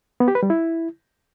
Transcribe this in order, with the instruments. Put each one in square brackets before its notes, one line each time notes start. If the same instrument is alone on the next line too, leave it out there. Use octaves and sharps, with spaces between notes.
[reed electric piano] B3
G4
B4
G3
E4